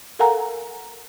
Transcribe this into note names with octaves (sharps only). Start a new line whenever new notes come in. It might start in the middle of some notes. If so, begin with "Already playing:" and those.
A4 A#4 F5 F#5 G#5 A#5